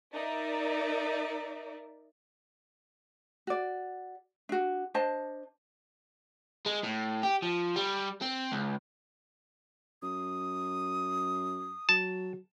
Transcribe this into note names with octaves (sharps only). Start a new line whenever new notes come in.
D#4 A#4 D5 E5
F#4 D5
D4 F#4
D4 C5 D#5 A5
G#3
A2
G4
F3
G3
C4
C#2
F#2 D#6
F#3 A5